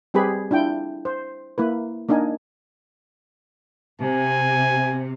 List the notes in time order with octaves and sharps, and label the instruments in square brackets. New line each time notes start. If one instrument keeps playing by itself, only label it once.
[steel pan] G3 C4 G4 G#4 B4 B5
D4 E4 F4 G5
C5
A#3 E4 B4
A#3 D4 D#4 A#4 G#5
[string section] C3 [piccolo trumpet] G#5